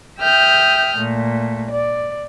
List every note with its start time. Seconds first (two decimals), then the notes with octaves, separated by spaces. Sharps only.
0.19 E5 G5 D#6 F6 G6
0.97 A#2 A3
1.71 D5